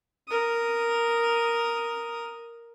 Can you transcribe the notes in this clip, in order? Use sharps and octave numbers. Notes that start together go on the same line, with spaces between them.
A#4 D#6